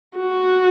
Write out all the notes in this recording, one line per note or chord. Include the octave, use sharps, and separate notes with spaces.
F#4